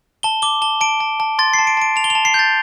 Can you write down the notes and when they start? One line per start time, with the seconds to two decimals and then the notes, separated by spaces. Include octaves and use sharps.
0.23 A5 G7
0.42 D6 G7
0.62 A5 G7
0.81 A5 D7
1.00 A5
1.20 A5
1.39 C6 A6
1.54 C7
1.59 A5
1.67 D7
1.77 A5 D7
1.96 A5 F7
2.04 G7
2.10 F7
2.15 A5
2.25 C7
2.34 G6 A6